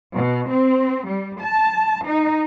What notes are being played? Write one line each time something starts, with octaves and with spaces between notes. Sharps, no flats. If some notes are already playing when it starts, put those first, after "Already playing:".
B2
C4
G3
A5
D#4